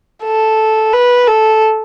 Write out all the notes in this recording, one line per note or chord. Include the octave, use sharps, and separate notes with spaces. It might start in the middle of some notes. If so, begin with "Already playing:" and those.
A4
B4
A4